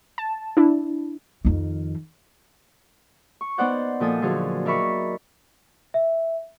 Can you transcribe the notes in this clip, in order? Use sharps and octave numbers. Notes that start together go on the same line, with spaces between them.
A5
D4 E4
F2 D#3
C#6
B3 D#4 C5 D5 F#5 G5
A#2 F3 A4 G5 G#5 D#6
D3 F3 F#3 G#4
D#4 A#4 D5 E5 B5 C#6
E5